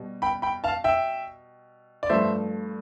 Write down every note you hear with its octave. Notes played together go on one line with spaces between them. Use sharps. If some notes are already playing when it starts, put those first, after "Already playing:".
Already playing: B2 G3
G5 B5
G5 B5
F5 A5
E5 G5
D5
G2 F3 A3 C5 E5